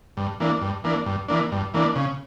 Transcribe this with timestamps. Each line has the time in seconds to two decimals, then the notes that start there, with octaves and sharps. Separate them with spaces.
0.17 G2
0.40 E3 A#3 D4
0.62 G2
0.84 E3 A#3 D4
1.06 G2
1.28 E3 A#3 D4
1.52 G2
1.74 E3 A#3 D4
1.95 C#3